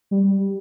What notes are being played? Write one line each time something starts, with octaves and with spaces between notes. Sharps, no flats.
G3